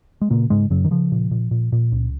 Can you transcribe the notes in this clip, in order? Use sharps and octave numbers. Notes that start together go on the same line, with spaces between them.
G#3
A#2 C#3 A#3
G#2 C#3 G#3
F#2 C#3 F#3
D#3
C#3 F3
A#2
A#2
A#2
A#2
C#2